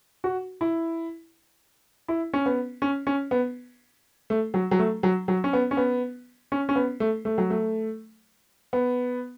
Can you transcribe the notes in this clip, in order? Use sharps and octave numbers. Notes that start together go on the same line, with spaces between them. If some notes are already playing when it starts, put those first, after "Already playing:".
F#4
E4
E4
C#4
B3
C#4
C#4
B3
A3
F#3
F#3
A3
F#3
F#3
C#4
B3
C#4
B3
C#4
C#4
B3
A3
A3
F#3
A3
B3